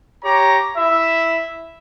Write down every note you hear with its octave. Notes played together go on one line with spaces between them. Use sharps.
G4 C#5 A#5
E4 E5